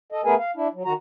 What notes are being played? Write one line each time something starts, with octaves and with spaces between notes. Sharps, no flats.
A4 D#5
A3 B3 G#4 A#4 B4 G#5
F5
D4 E4
F#3
D#3 F#4 A#5